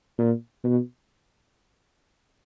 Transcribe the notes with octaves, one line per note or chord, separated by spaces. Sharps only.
A#2
B2